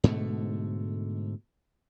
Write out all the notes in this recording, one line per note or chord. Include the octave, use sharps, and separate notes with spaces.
G#2 B2 D3 A3